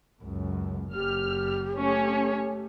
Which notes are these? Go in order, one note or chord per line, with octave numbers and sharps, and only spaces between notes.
C#2 F#2
F#1 G4 F6
A3 C#4 C#5